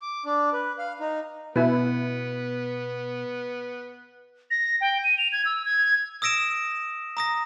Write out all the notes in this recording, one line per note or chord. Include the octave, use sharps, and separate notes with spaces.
D6
D4
B4
F5
D#4
B2 B3 E4 B4
A#6
G5
D#7
F7
G#6
E6
G#6
D#6 E6 A#6 D7 E7
A#5 D#6 A#6